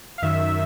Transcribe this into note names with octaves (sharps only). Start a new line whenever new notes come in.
F5
F#2 D#3 E5